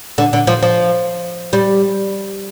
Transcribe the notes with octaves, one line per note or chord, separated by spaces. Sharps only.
D3
D3
F3
F3
G3